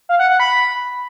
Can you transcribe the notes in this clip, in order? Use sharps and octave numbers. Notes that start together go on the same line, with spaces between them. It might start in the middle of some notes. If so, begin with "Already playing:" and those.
F5
F#5
F#5
B5